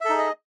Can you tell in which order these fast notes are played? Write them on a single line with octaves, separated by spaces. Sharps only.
E5 A4 D#4 G#4 D#5